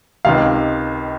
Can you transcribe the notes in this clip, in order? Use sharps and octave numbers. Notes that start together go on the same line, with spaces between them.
C#2 C3 D#3 F5